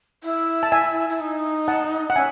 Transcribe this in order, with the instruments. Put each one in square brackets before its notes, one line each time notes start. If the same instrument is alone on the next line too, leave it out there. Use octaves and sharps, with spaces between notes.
[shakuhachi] E4
[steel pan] A5
E5 G#5
[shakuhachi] E4
D#4
[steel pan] F#5 A5
F#5
[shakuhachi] C#4 [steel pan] E5 G#5